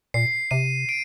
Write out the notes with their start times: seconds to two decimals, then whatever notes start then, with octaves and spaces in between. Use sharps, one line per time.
0.14 A#2 C7
0.51 C3 D#7
0.89 D7